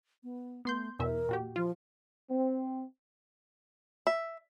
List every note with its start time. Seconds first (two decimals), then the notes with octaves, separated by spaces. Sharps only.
0.24 B3
0.65 A3 B3 C6 G6
0.99 E2 B2 A#4 E5
1.29 A#2 F#4 G4
1.56 F3 F4
2.29 C4
4.07 E5